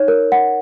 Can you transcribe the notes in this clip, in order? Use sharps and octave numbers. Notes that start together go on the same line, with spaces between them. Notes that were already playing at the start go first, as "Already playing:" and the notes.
Already playing: D#4 C#5
A#4
F#5